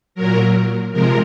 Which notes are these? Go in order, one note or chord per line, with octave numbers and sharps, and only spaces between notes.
A#2 F#3 A#4
C3 F3 G#3 A#4